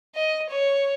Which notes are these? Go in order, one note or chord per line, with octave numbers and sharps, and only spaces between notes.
D#5
C#5